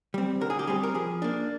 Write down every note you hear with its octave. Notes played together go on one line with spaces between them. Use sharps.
G3 C4
D3 A#4
G#4
G4
G3 C4 G#4
A#4
F3 G#4
A#3 D4